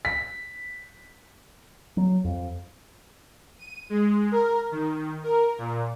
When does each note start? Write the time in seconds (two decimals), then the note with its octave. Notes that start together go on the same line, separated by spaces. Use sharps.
0.05 B6
1.97 F#3
2.24 F2
3.59 D#7
3.90 G#3
4.32 A#4
4.71 D#3
5.23 A#4
5.58 A#2